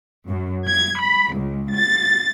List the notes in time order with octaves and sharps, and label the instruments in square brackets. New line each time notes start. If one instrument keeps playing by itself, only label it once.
[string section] F#2
G#6
B5
C#2
A6